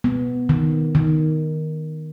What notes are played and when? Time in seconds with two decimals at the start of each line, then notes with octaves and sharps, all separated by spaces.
0.04 B3
0.49 D#3
0.95 D#3